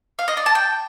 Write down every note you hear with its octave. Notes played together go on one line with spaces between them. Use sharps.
F5
D#5
D5
A5
G5